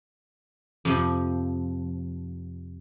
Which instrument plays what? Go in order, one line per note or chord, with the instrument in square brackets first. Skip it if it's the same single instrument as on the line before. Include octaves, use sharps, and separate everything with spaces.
[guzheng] F2 C3 F3